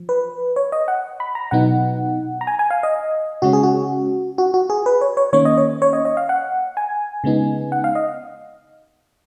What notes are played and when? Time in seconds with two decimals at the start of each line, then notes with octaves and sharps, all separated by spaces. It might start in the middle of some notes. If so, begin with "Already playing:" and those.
Already playing: F3
0.09 B4
0.56 C#5
0.72 D#5
0.88 F#5
1.20 B5
1.35 A#5
1.51 B2 F#3 B3 D#4 F#5
2.41 A#5
2.47 G#5
2.59 G#5
2.70 F5
2.83 D#5
3.42 C#3 G#3 C#4 F#4
3.53 G#4
3.63 F#4
4.38 F#4
4.54 F#4
4.70 G#4
4.86 B4
5.01 C#5
5.17 C#5
5.33 D#3 A#3 C#4 C#5
5.45 D#5
5.57 C#5
5.82 C#5
5.93 D#5
6.05 D#5
6.17 F5
6.29 F#5
6.77 G#5
7.24 C#3 G#3 B3 D#4
7.72 F#5
7.84 F5
7.95 D#5